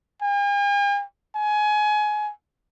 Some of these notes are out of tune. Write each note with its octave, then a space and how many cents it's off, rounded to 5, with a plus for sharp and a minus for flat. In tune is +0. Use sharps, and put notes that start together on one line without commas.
G#5 -45
G#5 +20